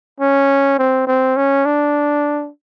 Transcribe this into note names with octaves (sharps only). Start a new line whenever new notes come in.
C#4
C4
C4
C#4
D4